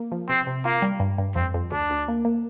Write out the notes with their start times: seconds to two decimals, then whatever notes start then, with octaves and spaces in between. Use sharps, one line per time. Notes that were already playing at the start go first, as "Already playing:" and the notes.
Already playing: A#3
0.12 F3
0.29 C3 C4
0.47 C3
0.65 A#3 F4
0.82 G3
1.00 G2
1.18 G2
1.36 F2 C4
1.54 F2
1.71 D2 D4
1.90 D2
2.08 A#3
2.25 A#3